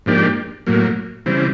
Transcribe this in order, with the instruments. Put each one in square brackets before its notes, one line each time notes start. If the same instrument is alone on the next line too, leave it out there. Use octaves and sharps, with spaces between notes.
[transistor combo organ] G#2 F3 A#3 D4 G4
A2 F#3 A#3
C#3 E3 G3 C4